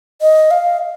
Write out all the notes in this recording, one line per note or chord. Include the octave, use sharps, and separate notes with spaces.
D#5
F5